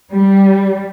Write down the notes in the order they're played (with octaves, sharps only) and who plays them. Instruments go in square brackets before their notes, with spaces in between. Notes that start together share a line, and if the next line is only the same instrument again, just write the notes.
[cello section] G3